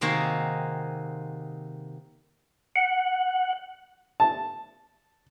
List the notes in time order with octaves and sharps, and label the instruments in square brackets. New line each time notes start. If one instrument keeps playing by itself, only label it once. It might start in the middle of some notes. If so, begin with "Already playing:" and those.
[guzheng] C3 D#3 A#3 C4 F#4 G#4
[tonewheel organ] F#5
[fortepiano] A5